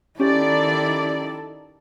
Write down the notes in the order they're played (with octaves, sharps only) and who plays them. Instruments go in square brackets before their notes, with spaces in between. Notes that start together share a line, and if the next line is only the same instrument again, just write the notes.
[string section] D#3 D5 [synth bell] C#4 G4 [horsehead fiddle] E4 A4